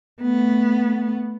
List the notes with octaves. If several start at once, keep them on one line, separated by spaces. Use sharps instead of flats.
A3 B3